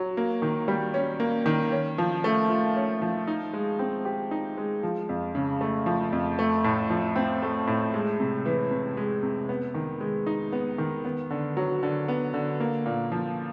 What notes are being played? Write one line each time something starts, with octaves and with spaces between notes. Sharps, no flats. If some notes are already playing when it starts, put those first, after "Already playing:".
Already playing: F#3
A#3
D#3
G3
C#4
A#3
D#3
C#4
F3
A3
F4
C#4
F3
D#4
G#3
C4
G4
D#4
G#3
F3
F2
C#3
A3
F3
F2
A3
A2
F3
C4
A3
A2
G#3
C3
E3
C3
G#3
C3
B3
D#3
G#3
D#4
B3
D#3
B3
D3
F#3
D3
B3
D3
A#3
A#2
F3